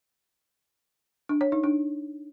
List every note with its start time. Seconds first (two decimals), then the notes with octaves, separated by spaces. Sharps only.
1.29 D4
1.41 C#5
1.52 D#4
1.64 D4